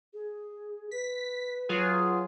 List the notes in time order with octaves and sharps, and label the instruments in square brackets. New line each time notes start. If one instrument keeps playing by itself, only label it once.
[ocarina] G#4
[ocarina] B4 [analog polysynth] B6
[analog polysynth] F#3 F4 G#4